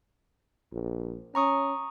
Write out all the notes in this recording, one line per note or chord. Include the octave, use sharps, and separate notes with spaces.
A#1
C#4 A#5 C#6 D#6